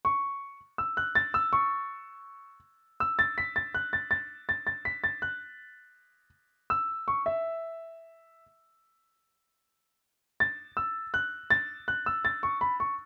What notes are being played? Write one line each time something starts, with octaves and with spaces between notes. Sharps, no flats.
C#6
E6
F#6
A6
E6
C#6
E6
A6
B6
A6
F#6
A6
A6
A6
A6
B6
A6
F#6
E6
C#6
E5
A6
E6
F#6
A6
F#6
E6
A6
C#6
B5
C#6